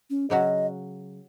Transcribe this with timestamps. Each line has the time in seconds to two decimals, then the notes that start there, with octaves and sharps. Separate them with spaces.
0.10 C#4
0.30 C#3 F#3 C#4 F#4 D#5